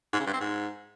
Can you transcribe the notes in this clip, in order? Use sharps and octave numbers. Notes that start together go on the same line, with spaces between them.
G#2
C#3
G2
C4
G#2